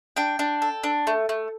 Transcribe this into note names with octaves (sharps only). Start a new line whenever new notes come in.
D4 G5
D4
A4
D4
A3
A3